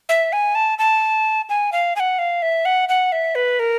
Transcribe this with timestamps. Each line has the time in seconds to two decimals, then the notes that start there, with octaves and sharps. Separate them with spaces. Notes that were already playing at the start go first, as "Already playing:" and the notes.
0.09 E5
0.33 G#5
0.55 A5
0.79 A5
1.49 G#5
1.72 F5
1.96 G#5
2.00 F#5
2.19 F5
2.42 E5
2.65 F#5
2.89 F#5
3.12 E5
3.35 B4
3.59 A#4